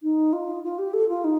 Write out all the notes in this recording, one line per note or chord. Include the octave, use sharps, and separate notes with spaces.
D#4
F4
F4
G4
A4
F4
D#4